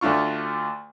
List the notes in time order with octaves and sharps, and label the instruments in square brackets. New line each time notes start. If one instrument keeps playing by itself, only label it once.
[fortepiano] D2 A3 D4 F4 C#6